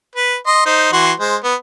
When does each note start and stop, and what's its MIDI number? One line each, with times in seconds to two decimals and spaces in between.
0.15 0.36 71
0.46 0.63 75
0.46 0.63 84
0.66 0.90 63
0.66 0.90 72
0.93 1.12 52
0.93 1.12 66
0.93 1.12 84
1.20 1.36 56
1.20 1.36 72
1.44 1.55 59